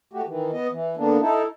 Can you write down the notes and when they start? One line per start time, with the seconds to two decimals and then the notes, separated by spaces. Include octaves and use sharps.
0.13 A3 F#4 G4
0.27 D#3 E3
0.52 B3 D#5
0.71 E3
0.97 D3 A#3 B3 D4
1.20 D#4 E4 A4